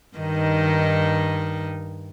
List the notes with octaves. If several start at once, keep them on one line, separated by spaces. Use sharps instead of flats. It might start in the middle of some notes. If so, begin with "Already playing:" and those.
G2 D#3 D#4